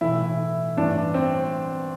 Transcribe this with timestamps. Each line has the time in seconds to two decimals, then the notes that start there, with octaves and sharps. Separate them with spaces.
0.01 B1 A2 E3 E4
0.77 A1 G2 E3 D4
1.14 C4